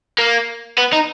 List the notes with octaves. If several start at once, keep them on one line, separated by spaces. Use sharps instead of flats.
A#3
B3
D#4